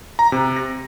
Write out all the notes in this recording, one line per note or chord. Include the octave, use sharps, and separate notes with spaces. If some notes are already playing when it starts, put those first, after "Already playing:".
A#5
C3
A#6